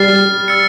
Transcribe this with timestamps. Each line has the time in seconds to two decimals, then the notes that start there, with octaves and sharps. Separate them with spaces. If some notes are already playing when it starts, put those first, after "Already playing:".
Already playing: G3 F6 A6 C7
0.48 E6 A6 C#7